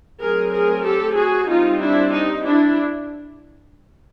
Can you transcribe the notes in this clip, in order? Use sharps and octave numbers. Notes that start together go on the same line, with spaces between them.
F#3 A3 C4 G#4 A#4
G#4 A#4
G4 A4
F#4 G#4
G3 C4 D#4 F4
D4 E4
D#4
D4 E4